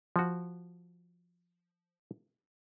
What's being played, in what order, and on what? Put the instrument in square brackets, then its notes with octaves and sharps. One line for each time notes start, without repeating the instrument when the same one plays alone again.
[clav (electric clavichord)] F3 F#4